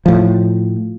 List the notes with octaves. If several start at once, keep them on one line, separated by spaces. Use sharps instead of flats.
A2 F3